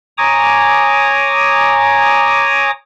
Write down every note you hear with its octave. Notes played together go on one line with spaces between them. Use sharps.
C#5 G#5 A#5 D6 D#6